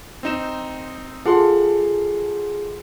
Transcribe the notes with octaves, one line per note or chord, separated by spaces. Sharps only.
C4 D#4 E7
F4 G#4 A4 F5 F#5 C6